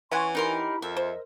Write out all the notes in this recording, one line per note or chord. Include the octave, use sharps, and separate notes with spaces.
E3 C#4 F#5 G#5 C6 C#6
D#4 E4 G4 A#4 B5 C6
F2 A#4 D#5 E5
C5